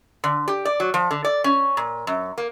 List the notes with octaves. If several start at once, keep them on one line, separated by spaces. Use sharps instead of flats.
D3
G4
D5
F#3
F3
D3
D5
C#4
A#2
F#2
A#3